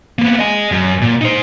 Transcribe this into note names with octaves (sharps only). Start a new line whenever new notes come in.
A#3 B3
D#5 G#5
F#2
A#2
D#4 C5